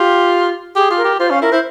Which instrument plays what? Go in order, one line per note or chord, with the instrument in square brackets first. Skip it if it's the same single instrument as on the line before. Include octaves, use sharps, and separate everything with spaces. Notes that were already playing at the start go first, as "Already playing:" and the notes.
Already playing: [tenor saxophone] F4 [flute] G4
[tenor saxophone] G4 [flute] G#4
[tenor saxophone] F4
[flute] A#4
[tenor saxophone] G4
[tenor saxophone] F4 [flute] C5
[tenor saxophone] C#4 [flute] F5
[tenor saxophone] E4 [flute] A#4
[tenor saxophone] E4 [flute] C5